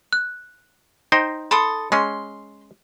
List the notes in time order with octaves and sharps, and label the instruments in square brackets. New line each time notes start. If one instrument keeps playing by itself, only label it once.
[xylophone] F#6
[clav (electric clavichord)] D#4 C5 G5 [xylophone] A#6
[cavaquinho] A4 C6 D#6 [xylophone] B5
[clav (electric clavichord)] G#3 C#4 [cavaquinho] C6